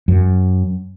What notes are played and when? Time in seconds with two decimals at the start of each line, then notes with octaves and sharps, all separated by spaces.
0.08 F#2